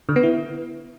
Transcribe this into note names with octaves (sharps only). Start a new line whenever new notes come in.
D3
B3
E4